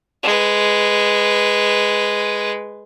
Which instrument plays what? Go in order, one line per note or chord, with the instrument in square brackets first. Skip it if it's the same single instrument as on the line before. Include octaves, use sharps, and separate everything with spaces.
[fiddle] G#3 B4